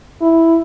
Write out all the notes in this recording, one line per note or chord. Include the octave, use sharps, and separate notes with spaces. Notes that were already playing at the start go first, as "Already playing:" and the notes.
E4